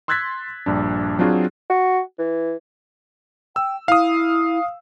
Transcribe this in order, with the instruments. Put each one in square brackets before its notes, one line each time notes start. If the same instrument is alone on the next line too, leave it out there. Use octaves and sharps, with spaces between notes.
[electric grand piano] C6 E6 F#6 G#6 A6 B6
A#1 G2 D4
F#3 C4 D4 F4 F#4 G#4
[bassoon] F#4
E3
[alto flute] G5 [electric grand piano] E6
[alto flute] E4 [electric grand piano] F5 D#6